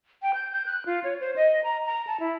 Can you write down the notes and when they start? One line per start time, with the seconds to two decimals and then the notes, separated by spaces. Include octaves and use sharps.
0.22 G5
0.34 G6
0.52 G6
0.66 F#6
0.86 F4
1.04 C#5
1.20 C5
1.36 D#5
1.63 A#5
1.86 A#5
2.07 A5
2.20 E4